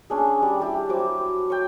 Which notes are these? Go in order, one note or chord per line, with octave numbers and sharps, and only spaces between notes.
C#4 D4 G#4
G3 D5
E4 G4 E5
F#3 C5 D6
C#5 G5